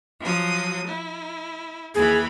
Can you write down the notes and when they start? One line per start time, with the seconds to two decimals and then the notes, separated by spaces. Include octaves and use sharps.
0.21 F3 F#3 D#6
0.85 E4
1.95 D#2 E3 G#4 B5